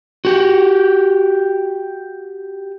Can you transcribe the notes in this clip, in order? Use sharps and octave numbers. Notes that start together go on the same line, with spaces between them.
F#4 G4